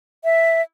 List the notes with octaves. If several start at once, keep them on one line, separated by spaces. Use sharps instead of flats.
E5